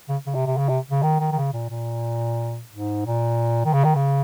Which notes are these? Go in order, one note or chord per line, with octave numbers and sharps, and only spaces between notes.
C#3
C#3
C3
C3
C#3
C3
C#3
D#3
D#3
D#3
C#3
A#2
A#2
G#2
A#2
D#3
C#3
D#3
C#3